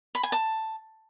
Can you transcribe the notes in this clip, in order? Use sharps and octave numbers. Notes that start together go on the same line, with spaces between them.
B5
G#5
A5